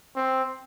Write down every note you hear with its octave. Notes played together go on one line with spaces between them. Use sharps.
C4